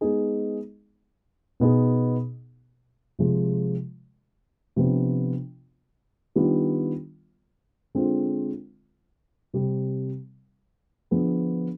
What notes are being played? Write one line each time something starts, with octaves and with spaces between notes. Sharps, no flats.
G#3 B3 D#4 G#4
B2 B3 D#4 G#4
C3 F3 G#3
C3 F3 B3 D4 F4
D#3 G3 B3 D4 F4
D3 G#3 C4 F4
C3 G3 C4
D3 F3 B3 D4 G#4